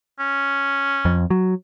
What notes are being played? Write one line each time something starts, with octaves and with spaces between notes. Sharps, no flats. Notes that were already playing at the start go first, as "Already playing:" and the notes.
C#4
F2
F#3